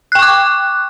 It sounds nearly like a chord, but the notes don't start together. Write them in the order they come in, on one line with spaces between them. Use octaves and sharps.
F#6 G5 C#6 D6